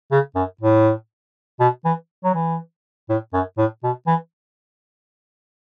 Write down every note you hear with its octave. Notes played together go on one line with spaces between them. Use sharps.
C#3
F#2
A2
B2
E3
F#3
E3
A2
F#2
A2
B2
E3